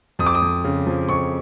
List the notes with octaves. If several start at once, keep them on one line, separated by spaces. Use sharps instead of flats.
F2 D#6
D6
D#6
F2
C#3
F3
F2 C#6